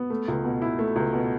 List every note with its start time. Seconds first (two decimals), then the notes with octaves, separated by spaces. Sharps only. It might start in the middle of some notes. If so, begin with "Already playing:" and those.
Already playing: B3
0.10 A3
0.28 C#2
0.44 B2
0.62 E4
0.79 A3
0.96 C#2
1.13 B2